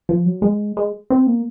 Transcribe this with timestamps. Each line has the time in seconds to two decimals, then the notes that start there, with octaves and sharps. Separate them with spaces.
0.09 F3
0.26 F#3
0.42 G#3
0.77 G#3
1.10 C4
1.27 A#3